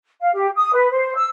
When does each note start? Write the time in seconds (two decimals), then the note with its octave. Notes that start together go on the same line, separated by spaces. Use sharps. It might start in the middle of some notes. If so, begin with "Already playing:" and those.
0.19 F5
0.33 G4
0.55 D#6
0.73 B4
0.90 C5
1.14 E6